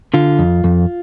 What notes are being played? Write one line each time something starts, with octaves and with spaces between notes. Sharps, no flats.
D3 F4
F2
F2